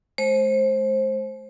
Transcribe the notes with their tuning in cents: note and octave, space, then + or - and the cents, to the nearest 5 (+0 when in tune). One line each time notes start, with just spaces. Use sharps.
G#3 +45 C5 +20